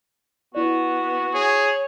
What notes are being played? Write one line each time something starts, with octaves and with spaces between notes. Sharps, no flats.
B3 E4 F#4 D5
G#4 C#5